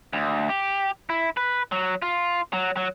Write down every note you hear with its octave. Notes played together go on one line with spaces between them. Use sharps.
D2
G4
E4
B4
F#3
F4
F#3
F#3